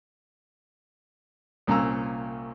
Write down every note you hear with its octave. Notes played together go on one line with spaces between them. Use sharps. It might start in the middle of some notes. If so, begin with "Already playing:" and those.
C2 A#2 C#4 F5 A#5 E6